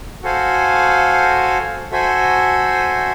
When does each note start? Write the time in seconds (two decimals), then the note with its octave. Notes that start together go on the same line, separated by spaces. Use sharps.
0.23 F#4 A4 C5 F5 G#5
1.92 F#4 A4 C5 E5 G#5